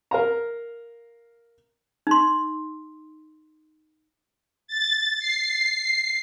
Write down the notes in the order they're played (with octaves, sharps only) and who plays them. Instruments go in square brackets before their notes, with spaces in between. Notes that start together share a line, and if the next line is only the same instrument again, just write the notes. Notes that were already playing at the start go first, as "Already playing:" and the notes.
[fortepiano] A#4 F5 A#5
[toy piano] D#4 C6
[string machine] A6
C7